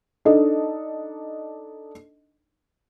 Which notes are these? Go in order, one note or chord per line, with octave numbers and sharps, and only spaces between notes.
D4 D#4 A4 D#5